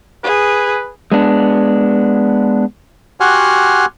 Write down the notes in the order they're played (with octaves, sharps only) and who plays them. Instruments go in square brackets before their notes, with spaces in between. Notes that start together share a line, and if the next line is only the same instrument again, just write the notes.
[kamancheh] G#4 [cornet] B4
[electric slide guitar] G#3 B3 D4
[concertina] F#4 G4 F#5 G#5 C6 F6